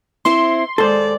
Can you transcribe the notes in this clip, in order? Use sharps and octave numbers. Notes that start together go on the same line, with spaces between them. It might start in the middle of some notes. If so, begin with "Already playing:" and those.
C4 E4 C5 C6
D#2 G#3 A4 C5 D5